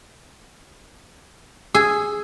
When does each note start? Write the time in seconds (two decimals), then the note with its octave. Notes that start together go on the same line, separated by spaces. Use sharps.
1.75 G#4 E6